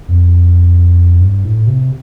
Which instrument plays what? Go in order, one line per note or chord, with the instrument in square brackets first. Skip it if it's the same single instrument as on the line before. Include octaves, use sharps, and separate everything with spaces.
[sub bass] F2
G2
A2
C3